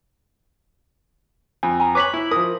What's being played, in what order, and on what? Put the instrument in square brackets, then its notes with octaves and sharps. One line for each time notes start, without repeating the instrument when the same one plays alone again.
[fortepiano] F2 [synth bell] G#5
[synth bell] G#5 A#5
[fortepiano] B4 C#5 [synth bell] D6 B6 F#7
[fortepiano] E4
[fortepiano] F3 D#6 [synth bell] A#4